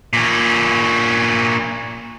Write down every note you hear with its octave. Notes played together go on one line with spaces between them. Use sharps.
A#2 C#4